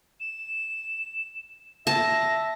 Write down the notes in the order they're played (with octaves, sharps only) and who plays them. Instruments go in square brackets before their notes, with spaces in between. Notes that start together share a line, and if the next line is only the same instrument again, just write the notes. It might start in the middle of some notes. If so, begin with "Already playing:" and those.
[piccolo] E7
[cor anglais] E5 [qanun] A5 [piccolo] A#6